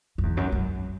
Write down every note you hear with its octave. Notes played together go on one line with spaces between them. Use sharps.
F#2
E2
F#2
F#2